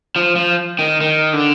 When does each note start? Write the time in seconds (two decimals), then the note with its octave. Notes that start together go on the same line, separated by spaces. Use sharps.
0.16 F3
0.36 F3
0.79 D#3
1.01 D#3
1.33 D3